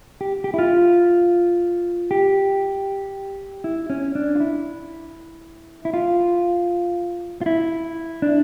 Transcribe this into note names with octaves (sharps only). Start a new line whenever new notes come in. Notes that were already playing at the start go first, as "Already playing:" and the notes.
G4
G4
E4
F4
G4
E4
C#4
D4
F4
E4
E4
F4
F4
E4
D4